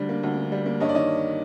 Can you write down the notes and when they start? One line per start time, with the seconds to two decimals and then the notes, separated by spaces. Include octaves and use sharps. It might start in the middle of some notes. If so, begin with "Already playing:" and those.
Already playing: D2 D3 G3
0.09 A#3
0.23 D2
0.37 D3
0.52 G3
0.66 A#3
0.80 G2 C#5 D#5
0.89 D5
0.95 D#3 C#5 D#5